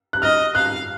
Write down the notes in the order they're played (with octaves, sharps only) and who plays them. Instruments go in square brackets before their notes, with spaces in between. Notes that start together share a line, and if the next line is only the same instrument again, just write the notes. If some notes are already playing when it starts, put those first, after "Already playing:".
[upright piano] F#6
[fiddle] D#5 [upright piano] F6
[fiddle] F5 [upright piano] F#6